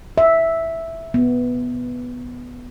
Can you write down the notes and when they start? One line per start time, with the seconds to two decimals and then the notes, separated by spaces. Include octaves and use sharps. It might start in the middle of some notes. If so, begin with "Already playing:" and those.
0.18 E5
1.14 B3